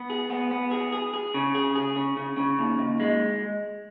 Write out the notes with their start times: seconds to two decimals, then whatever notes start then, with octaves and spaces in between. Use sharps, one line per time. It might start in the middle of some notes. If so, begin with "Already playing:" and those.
Already playing: B3
0.10 G#4
0.30 B3
0.51 B3
0.71 G#4
0.92 G#4
1.14 G#4
1.34 C#3
1.55 G#4
1.76 G#4
1.96 C#3
2.17 C#3
2.37 C#3
2.59 D#2
2.79 D#2
3.00 G#3